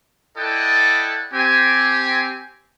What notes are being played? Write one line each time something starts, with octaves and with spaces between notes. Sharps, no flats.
E4 A4 D5 D#5 F#5 G5
C4 G4 G#5